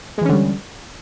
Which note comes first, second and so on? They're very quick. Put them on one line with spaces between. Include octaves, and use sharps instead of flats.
G#3 E3 C#4 D3 G3